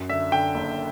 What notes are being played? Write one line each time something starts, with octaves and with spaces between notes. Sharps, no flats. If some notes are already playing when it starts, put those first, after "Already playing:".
Already playing: F#2
D3 E5
D3 G5
F#1